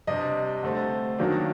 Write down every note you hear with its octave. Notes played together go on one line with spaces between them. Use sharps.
C3 G3 D4 D#5
D3 A3 C4
D#3 F#3 A#3 D4